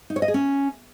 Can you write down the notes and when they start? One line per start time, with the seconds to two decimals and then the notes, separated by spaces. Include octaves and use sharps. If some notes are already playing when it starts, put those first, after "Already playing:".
0.10 D#4
0.16 C#5
0.22 D#5
0.28 G#4
0.34 C#4